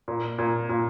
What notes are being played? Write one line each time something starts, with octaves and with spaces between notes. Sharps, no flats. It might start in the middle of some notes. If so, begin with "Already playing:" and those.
A#2
A#2
A#2